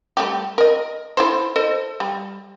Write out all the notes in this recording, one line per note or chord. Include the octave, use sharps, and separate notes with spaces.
G3 A3 G4
A#4 D#5
E4 A4 C5
A4 C5 D#5
G3